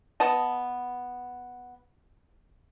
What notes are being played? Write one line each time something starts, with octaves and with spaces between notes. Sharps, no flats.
B3 D#5 A5